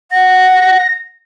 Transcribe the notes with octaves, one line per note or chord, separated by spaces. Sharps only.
F#5 A#6